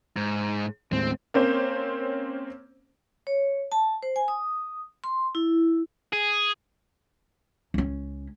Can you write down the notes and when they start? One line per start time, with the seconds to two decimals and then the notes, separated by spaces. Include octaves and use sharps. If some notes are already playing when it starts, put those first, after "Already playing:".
0.16 G#2
0.93 D#2 A2 G#3 C4
1.34 A#3 C4 C#4 C5
3.27 C#5
3.72 A5
4.03 C5
4.16 G#5
4.28 D#6
5.04 C6
5.35 E4
6.13 G#4
7.74 C#2 C#4